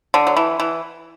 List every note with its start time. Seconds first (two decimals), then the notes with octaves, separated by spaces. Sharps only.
0.14 D3
0.27 F#3
0.37 E3
0.60 E3